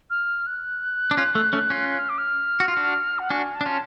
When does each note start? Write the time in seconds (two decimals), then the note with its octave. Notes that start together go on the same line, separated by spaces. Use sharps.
0.10 F6
0.47 F#6
1.11 D4
1.17 C#4 F4
1.35 A3
1.53 A3 C#4
1.70 C#4 F4
1.89 F#6
1.99 F6
2.09 D6
2.18 F6
2.60 F#4
2.68 F4
2.77 D4 F#4
3.19 F#5
3.30 D4 F#4 G#5
3.55 A5
3.61 D4
3.66 C#4 F4